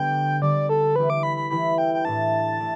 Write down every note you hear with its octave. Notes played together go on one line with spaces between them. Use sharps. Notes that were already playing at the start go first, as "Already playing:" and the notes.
Already playing: D3 G3 B3 D4 G4 G5
D3 G3 D4 G4 D5
A4
E3 A3 E4 G4 B4
D6
B5
B5
E3 A3 E4 G4 B5
G5
G5
A2 A3 D4 A5
A3 D4